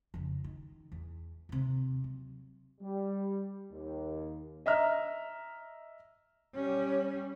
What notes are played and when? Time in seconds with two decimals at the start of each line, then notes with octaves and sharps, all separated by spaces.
0.14 F2 C#3
0.44 D#3
0.92 E2
1.49 D#2 C3
2.04 F#3
2.81 G3
3.71 D#2
4.66 D#5 E5 A#5 F6
6.54 G3 C#4